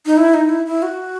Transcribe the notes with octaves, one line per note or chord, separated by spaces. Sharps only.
D#4
E4
D#4
E4
E4
F#4